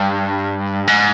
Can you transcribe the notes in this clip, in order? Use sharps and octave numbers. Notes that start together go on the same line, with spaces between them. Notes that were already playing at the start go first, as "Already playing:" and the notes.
Already playing: G2
G#2